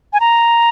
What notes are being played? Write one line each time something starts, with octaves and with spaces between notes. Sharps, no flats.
G#5
A#5